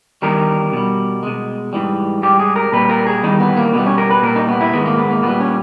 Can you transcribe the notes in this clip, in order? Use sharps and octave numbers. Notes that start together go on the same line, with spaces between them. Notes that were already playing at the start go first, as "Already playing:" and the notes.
E2 D#3 G3 A#4
B2 G3
B2 G#3
G#2 E3 G3
G#2 G3 G4
G#4
A#4
A#2 G3 B4
A#4
G#4
E2 D#3 G3 D#4
B3
A#3
B2 G3 B3
C#4
A#4
B4
A#2 G3 A#4
D#4
B3
E4
G#2 D#3 G#3 B3
A#3
B3
A#3
A#2 G3 B3
C#4